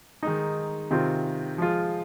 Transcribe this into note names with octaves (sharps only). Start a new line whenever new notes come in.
D#3 G#3 D#4
C3 D#3 C4 F4
F3 G#3 F4